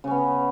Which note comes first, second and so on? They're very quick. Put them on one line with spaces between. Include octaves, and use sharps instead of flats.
C#3 C#4 B3